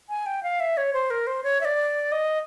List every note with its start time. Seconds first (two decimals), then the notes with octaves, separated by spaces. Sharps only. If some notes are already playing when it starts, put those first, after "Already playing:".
0.09 G#5
0.26 G5
0.43 F5
0.60 E5
0.77 C#5
0.93 C5
1.10 A#4
1.27 C5
1.44 C#5
1.61 E5
1.65 D5
2.12 D#5